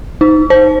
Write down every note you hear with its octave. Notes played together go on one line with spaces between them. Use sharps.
D#4
C5